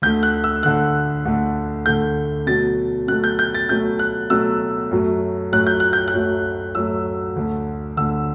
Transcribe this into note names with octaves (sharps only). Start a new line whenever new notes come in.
D2 D3 A3 G6
F#6
E6
D2 D3 A3 F#6
D2 D3 A3
D2 D3 A3 G6
B2 F#3 A3 A6
B2 F#3 A3 F#6
G6
G6
A6
B2 F#3 A3 G6
F#6
B2 F#3 A3 E6
F#2 F#3 A3
F#2 F#3 A3 F#6
G6
F#6
G6
F#6
F#2 F#3 A3
F#2 F#3 A3 E6
D2 D3 A3
D2 D3 A3 E6